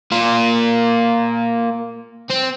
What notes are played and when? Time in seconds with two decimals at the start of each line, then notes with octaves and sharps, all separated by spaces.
0.12 A#3 F4
2.30 C4